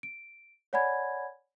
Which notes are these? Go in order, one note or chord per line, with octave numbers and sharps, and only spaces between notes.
D7
C#5 D5 F#5 G#5 B5 G#6